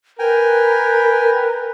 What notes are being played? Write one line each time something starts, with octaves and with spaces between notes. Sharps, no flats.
A#4 B4 G5 G#5